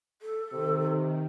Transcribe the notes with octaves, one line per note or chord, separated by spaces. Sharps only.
A4
C3 D#3